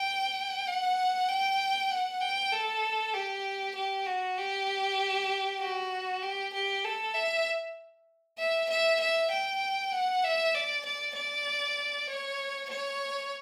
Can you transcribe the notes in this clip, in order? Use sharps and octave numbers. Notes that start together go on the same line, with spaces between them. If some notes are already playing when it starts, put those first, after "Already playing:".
Already playing: G5
F#5
G5
F#5
G5
A4
G4
G4
F#4
G4
F#4
G4
G4
A4
E5
E5
E5
E5
G5
F#5
E5
D5
D5
D5
C#5
C#5